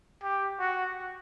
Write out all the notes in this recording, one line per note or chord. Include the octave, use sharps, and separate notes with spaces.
G4
F#4